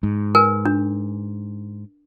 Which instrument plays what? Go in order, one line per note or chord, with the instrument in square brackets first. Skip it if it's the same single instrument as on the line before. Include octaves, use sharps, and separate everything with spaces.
[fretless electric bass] G#2
[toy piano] A#4 B4 G#5
D4